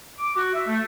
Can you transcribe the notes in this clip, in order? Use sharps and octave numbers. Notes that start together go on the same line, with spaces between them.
D6
F#4
E5
A3